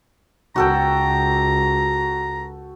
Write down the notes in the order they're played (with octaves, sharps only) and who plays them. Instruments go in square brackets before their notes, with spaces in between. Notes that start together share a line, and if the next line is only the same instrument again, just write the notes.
[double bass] C#2 [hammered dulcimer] F#4 A4 G5 [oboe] A#5